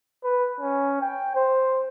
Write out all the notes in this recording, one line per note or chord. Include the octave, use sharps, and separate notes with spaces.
B4
C#4
G5
C5